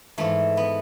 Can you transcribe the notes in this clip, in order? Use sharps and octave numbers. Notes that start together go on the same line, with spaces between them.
G#2 E3 A3
B3